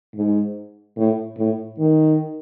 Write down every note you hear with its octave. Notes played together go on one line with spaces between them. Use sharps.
G#2
A2
A2
D#3